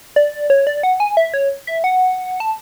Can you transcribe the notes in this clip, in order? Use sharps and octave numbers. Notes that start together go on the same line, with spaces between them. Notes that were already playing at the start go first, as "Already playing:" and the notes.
D5
C#5
D5
F#5
G#5
E5
C#5
E5
F#5
A5